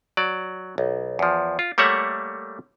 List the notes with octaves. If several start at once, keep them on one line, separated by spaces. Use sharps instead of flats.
F#3 D5
B1
E2 F3
F4
G3 A3 A#3 C#5 E5 F#5